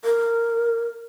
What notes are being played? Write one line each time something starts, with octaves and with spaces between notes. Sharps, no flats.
A#4